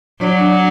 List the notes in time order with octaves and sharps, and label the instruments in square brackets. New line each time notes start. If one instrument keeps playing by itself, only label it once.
[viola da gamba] F#3 [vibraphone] D4 D5